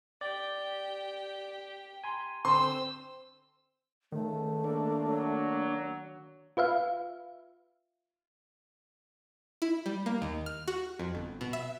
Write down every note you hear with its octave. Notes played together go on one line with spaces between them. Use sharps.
G4 D5 G5
G#5 A#5 C6
D3 C4 C5 C6 E6
C#2 D#3 A3
A#3 D4
F#3
F4 B4 E5 F5
E4
G3
A#3
D#2
F6
F#4
F2
G1
B2
E5